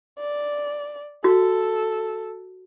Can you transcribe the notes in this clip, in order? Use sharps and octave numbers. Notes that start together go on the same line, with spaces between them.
D5
F#4 A4